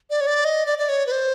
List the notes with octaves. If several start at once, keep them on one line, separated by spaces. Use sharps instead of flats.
D5
C#5
D5
D#5
D5
D5
C#5
B4
C5